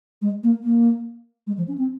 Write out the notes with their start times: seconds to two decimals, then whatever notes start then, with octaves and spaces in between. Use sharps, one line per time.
0.22 G#3
0.43 A#3
0.63 A#3
1.47 G#3
1.58 F3
1.68 C#4
1.78 C4